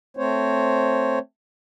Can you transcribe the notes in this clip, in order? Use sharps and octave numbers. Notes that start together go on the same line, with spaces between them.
A3 C4 C5 C#5